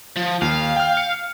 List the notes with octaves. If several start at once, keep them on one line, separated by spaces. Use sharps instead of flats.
F3
D#2 F5
G5 F6
C#7